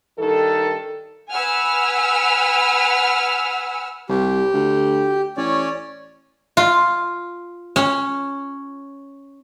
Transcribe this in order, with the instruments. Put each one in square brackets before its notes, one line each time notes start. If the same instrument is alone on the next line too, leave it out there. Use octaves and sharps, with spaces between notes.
[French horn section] G2 D#3 A4
[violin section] B4 F#5 G#5 E6 F6
[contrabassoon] C2 [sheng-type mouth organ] G4
[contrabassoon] D2
[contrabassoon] A1 [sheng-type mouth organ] C#4 C#5 D5
[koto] F4
C#4